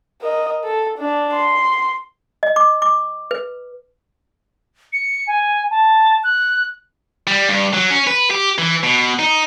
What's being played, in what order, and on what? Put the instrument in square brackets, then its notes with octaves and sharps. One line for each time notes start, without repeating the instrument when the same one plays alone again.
[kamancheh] A#4 D#5
A4
D4
C6
[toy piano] D#5
D6
D6
B4
[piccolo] C#7
G#5
A5
F#6
[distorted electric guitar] G3
G2
F#3
C#4
B4
G4
E3
B2
D#4